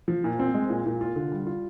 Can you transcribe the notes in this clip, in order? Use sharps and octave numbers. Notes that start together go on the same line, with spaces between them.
F3
A#2
C4
G#3
A#2
A#2
F4
D3
G3
F4